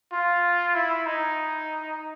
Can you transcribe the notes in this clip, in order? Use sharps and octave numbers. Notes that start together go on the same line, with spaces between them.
F4
E4
D#4